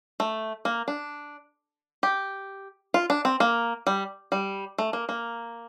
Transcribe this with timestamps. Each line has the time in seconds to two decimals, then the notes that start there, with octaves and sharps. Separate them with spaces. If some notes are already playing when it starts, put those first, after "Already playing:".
0.20 A3
0.65 A#3
0.88 D4
2.03 G4
2.94 F4
3.10 D4
3.25 C4
3.40 A#3
3.87 G3
4.32 G3
4.78 A3
4.93 A#3
5.09 A#3